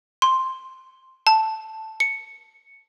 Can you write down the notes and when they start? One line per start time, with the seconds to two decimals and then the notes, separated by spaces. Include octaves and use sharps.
0.22 C6
1.27 A5
2.00 C#7